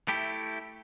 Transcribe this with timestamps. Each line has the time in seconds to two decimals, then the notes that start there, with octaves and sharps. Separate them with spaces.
0.08 A3 E4 G4